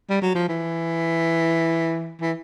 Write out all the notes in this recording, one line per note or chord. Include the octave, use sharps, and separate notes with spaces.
G3
F#3
F3
E3
E3